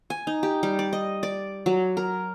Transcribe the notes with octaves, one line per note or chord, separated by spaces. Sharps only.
G#5
D#4
G4
G3
D5
D#5
D5
F#3
A#4